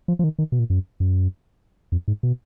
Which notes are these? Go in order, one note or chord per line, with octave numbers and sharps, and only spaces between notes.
F3
F3
D#3
D#3
B2
A#2
F#2
F#2
F2
G#2
B2